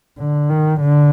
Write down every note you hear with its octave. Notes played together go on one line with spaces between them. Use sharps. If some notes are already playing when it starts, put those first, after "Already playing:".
D3
D#3
D3